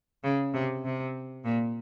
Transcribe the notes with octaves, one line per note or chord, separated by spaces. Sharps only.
C#3
C3
C3
A#2